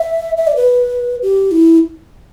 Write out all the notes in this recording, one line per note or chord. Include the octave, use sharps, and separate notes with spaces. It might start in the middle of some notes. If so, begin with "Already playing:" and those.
Already playing: E5
E5
D5
B4
G4
E4